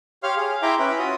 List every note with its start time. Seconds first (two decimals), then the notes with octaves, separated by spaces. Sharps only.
0.23 G4 C#5 F5 C6 F6
0.37 G#4 F5
0.62 E4 E5 G5 A#5 C6 D6
0.79 C#4 B4 E5
0.99 F4 F#4 D#6